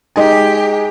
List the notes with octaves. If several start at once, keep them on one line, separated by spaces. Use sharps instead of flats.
G#3 D#4 G4 G#5